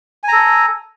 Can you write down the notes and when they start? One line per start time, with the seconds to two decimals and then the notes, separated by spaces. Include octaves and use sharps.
0.23 G#5
0.28 A#5
0.33 A4